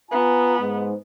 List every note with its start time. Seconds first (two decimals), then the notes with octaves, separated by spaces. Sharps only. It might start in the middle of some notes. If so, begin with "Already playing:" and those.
0.11 B3 F4 G#5 A#5
0.60 G#2